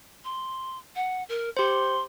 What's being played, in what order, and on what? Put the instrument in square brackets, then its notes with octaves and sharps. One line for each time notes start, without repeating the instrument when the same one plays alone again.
[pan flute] C6
F#5
A#4
[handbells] G4 C5 [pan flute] C6